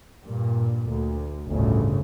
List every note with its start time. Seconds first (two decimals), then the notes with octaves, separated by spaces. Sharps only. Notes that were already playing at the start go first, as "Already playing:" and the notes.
0.23 G2 A#2
0.87 D2
1.48 G1 D2 A2 C#3